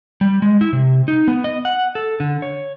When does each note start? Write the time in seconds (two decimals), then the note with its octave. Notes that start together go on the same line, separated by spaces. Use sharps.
0.21 G3
0.42 G#3
0.61 E4
0.73 C3
1.08 D#4
1.28 B3
1.44 D#5
1.65 F#5
1.95 A4
2.20 D3
2.42 C#5